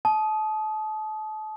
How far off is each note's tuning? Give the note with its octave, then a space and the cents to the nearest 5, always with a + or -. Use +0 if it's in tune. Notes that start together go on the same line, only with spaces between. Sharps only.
A5 -30 D#6 +5